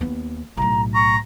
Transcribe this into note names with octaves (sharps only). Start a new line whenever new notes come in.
D#2 B3
B1 A2 A#5
A#5 C#6